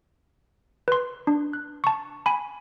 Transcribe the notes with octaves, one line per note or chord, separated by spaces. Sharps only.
B4 C6
D4
F#6
A5 C#6
G#5 B5